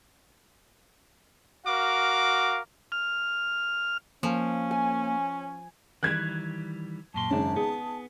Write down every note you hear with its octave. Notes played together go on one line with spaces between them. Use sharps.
F#4 A#4 F5 D6
F6
F3 A#3 C#4
G#5
D#3 E3 G3 F#6 G#6
F#2 A#2 A5 C6
G#1 F#2 C#3 C#4 D4
B3 G#4